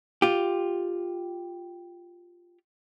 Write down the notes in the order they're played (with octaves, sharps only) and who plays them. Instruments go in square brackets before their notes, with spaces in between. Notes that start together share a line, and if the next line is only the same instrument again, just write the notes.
[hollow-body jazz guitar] F4 G4